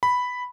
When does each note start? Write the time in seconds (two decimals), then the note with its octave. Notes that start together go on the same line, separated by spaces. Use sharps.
0.03 B5